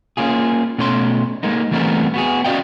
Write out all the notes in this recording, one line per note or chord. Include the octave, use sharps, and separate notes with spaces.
A#3 C#4 F4 G#4
B2 A3 C#4 C5 C6
G#3 A#3 D#4
E3 G3 A3 B3 C4 A#4
B3 F#4 G#4
C#4 F#4 D5 D#5 F5 G5